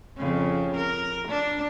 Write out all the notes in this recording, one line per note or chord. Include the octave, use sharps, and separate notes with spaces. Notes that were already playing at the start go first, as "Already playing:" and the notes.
F2 C#3
A#4
D4